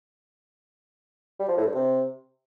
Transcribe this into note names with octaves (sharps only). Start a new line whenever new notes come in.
G3
F3
A2
G2
C3